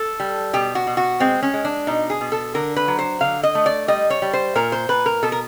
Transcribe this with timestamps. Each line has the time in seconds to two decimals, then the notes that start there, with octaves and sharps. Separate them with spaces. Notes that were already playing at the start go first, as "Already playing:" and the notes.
Already playing: A4
0.20 G3
0.53 B2 G4
0.75 F#4
0.87 B2
0.97 F#4
1.20 G#3 C4
1.43 C#4
1.54 G#3
1.65 D4
1.87 B2 D#4
2.10 G#4
2.21 B2
2.32 A4
2.54 D3 A#4
2.76 B4
2.88 F#3
2.99 C5
3.21 D3 F5
3.43 D#5
3.55 A3
3.66 D5
3.88 G3 D#5
4.10 C#5
4.22 G3
4.33 C5
4.56 A#2 A#4
4.72 C5
4.89 A#2 B4
5.06 A#4
5.23 B2 A4
5.32 A#4